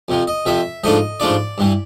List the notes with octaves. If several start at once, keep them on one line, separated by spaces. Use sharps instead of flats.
F2 C3 F3
D#5
F2 C3 F3 E5
G#2 F3 A3 D4 F4 D#5
G#2 F3 A3 D4 F4 D5
G2 E3 G3